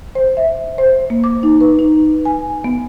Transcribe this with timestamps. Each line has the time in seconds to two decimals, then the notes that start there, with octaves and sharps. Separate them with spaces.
0.15 C5
0.37 E5
0.78 C5
1.10 A#3
1.24 D6
1.43 D#4
1.60 B4
1.79 D#4
2.25 G#5
2.64 B3